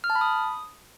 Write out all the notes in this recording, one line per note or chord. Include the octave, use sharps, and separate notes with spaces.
F6
A5
B5
D#6